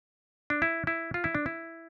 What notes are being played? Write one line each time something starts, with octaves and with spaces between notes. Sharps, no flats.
D4
E4
E4
F4
E4
D4
E4